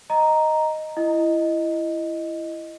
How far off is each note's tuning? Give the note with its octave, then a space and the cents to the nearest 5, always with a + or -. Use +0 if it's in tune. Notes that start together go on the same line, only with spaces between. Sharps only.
D#5 +0 A#5 +0
E4 +20 D#5 +0